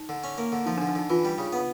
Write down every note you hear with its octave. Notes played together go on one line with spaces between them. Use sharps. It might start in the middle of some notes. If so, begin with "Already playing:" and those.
Already playing: D#4
D3
C#4
A#3
D3
F3 D#4
D4
D3
D4
D3 D#4
E3 F4
G3
C#3
B3